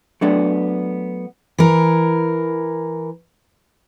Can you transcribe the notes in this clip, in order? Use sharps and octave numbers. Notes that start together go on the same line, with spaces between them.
F#3 A3 B3 D4
E3 A#4